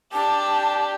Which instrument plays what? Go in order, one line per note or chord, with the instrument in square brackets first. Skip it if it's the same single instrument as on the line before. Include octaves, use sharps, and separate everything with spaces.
[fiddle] D4 G4 [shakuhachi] A5